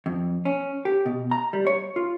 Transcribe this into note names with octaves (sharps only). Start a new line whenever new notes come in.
F2
C#4
G4
B2
A#5
G3
C#5
F4